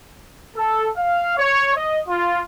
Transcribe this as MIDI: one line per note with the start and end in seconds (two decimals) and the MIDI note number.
0.55 0.88 69
0.96 1.35 77
1.36 1.72 73
1.74 1.99 75
2.06 2.38 65